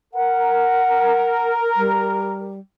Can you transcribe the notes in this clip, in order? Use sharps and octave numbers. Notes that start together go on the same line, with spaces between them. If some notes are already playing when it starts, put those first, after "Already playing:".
A#4 F#5
G3